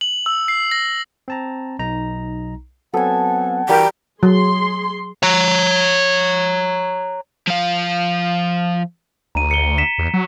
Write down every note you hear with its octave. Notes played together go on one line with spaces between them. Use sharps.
F#7
E6
C7
A#6
C4 A5 A#5
B1 D#4 A#5
F#3 B3 C4 A4 F#5 G#5
E3 G3 F#4 A#4 G5
F#3 G#4 C6
C#5 A#5
F3 F5
D2 A#5 D#7
C#7 G7
B6 E7
E2
F#3